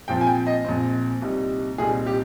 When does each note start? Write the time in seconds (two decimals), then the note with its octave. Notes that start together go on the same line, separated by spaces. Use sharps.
0.08 A#1 A#2 F3 C4 G5
0.21 G#5
0.27 G5
0.47 D#5
0.65 A#1 A#2 F3 C4
1.22 C2 A#2 G3 C4 D#4
1.78 C2 A#2 G3 C4 D#4 G#4
2.06 G4